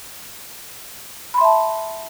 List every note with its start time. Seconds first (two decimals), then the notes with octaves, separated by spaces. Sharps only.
1.34 B5
1.37 C6
1.41 E5
1.44 A5